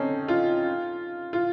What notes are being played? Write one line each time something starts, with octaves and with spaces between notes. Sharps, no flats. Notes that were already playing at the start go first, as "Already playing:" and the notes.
Already playing: C4 C#4 D#4 A4
F4
F4